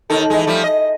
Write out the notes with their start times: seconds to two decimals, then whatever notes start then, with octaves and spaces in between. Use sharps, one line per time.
0.10 D#2 D#3 A4
0.30 E3 G#3
0.47 F3 G3 A3
0.64 D#5